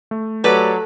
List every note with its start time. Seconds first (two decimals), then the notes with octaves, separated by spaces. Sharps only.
0.11 A3
0.44 F#3 G4 A4 B4 D5